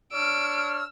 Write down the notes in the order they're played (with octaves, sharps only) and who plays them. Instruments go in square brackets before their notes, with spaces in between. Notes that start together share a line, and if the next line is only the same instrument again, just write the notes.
[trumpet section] D4 C#5 [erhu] E6 [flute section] F6 [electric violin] D7